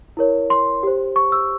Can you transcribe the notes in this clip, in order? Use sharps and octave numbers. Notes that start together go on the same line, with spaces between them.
E4 A#4 C#5
C6
G4 C5
C#6
E6